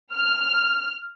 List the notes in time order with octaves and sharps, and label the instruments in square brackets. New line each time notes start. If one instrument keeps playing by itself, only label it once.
[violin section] F6